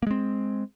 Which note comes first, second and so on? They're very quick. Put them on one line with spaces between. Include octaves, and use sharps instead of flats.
A#3 G#3 C4